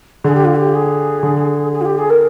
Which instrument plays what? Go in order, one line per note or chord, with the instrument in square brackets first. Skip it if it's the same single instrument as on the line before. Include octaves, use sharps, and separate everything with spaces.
[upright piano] D3 [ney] G#4
[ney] G4
F4
G4
G#4
[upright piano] D3
[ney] G#4
F4
G4
G#4
A#4